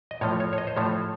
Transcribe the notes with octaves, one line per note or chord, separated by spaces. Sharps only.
D#5
A2 F3 A3 C#5
C#5
C#5
D#5
C5
A2 F3 A3 C#5